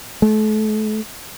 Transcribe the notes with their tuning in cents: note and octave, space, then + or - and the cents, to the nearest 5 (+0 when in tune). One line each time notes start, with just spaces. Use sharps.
A3 -35